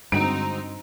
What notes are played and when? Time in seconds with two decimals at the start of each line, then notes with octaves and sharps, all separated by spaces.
0.12 G2 D3 G#3 C4 D#4 F#4 D7